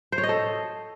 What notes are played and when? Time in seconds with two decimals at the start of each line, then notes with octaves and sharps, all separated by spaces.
0.12 C5
0.18 C#5
0.23 D#5
0.29 A4